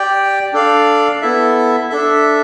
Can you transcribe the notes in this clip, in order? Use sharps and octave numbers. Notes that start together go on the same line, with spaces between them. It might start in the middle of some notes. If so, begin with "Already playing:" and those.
Already playing: G4 D5 G5
D4 A4 D5 F5
B3 E4 A4 E5
D4 A4 E5